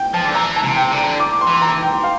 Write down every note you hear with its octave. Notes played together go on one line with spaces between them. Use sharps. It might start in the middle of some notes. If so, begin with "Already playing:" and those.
Already playing: G5
F3 A5
D3
E3 A#5
A5
C3
G5
D3
A#5
D6
C6
E3
A#5
G5
F5